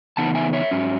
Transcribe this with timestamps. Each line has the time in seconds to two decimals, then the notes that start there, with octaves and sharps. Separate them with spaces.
0.17 C#3 E3 B3 D#4 F#5 A5
0.35 E5 G#5
0.53 C#5 E5
0.71 G#2 F#3 C#4